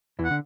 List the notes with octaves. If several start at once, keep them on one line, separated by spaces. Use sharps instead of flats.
E2 E3
F#5
D3